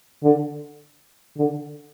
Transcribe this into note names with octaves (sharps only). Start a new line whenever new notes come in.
D3
D3